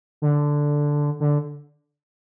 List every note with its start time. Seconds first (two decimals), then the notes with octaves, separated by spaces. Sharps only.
0.22 D3
1.20 D3